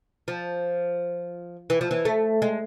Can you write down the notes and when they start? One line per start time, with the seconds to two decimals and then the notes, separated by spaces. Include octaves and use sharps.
0.28 F3
1.70 E3
1.81 F3
1.91 E3
2.05 A3
2.42 G#3